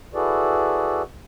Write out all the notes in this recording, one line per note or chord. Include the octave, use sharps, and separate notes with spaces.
E4 F#4 G#4 A4 B4 D5